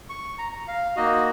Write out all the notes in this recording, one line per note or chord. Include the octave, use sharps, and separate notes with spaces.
C#6
A#5
A#5
F5
A#3 D#4 F#4 D#5